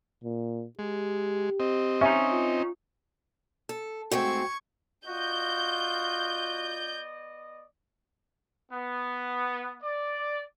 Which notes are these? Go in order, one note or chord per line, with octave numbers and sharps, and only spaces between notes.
A#2
G#3 G4
C4 D#5
C#4 D#4 E5
F4
A4
G#2 A3 C4 F#4 G5 C#6 G#6
B3 F4 F#4 D5 D#5 G6
B3
D5